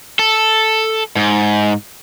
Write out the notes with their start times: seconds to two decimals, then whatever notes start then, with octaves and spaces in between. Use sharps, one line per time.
0.19 A4
1.16 G#2